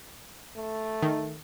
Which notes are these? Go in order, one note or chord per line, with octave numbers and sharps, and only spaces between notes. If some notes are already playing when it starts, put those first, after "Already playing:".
A3
D#3